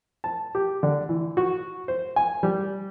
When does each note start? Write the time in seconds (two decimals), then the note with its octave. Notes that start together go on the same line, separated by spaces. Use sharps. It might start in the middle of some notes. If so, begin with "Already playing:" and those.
0.24 A5
0.55 G4
0.83 D3
1.09 E3
1.37 F#4
1.88 C5
2.16 G#5
2.43 G3